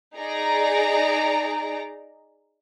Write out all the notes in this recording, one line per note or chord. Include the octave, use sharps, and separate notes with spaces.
D#4 G#4 D5 A#5